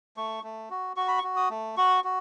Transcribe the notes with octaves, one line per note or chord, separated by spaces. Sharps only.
A3 C#6
A3
F#4
F#4 C#6
B5
C#6
F#4
D#6
A3
F#4 C#6
F#4